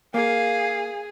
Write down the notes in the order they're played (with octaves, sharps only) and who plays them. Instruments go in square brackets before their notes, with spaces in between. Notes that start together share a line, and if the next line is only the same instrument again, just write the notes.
[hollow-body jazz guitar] A#3 [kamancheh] G#4 [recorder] F5